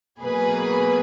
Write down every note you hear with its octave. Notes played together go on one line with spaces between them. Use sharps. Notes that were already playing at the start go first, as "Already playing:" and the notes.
B2 F#3 A#3 G#4 B4